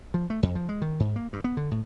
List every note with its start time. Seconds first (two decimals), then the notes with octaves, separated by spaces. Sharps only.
0.14 F3
0.30 A3
0.43 F2
0.55 F3
0.69 G#3
0.82 D#3
1.00 G#2
1.16 A#3
1.33 G2
1.44 B3
1.57 D3
1.71 A2